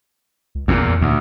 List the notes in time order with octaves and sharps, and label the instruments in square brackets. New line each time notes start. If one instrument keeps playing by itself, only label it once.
[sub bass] C#2
[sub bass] G#1 [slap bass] E2 A#2
[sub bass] F2
[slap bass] D2 [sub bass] A#2